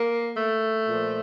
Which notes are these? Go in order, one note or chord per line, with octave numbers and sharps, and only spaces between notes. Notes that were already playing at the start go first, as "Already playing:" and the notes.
Already playing: A#3
A3
A#2 F3